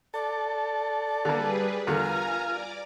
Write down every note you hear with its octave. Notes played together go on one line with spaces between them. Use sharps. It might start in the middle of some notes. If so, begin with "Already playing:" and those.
A4 D5
D3 G3 A#3 G#4 B4
E2 D3 F4 A#4 G#5 A#5
D5 D6